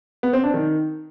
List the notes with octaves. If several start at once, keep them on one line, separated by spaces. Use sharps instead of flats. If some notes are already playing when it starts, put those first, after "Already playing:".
B3
C4
D4
D#3